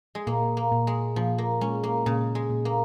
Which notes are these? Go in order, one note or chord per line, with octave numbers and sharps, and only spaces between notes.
G#3
A#2 A#3
A#3
A#2
G#3
A#2 F3
A#3
G#3 C#4
A#3
A#2 C#3
G#3
A#2
A#3